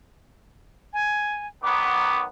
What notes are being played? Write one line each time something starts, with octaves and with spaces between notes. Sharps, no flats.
G#5
D#3 F#3 B3 D6